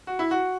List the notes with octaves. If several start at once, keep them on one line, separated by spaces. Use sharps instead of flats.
F#4
E4
F#4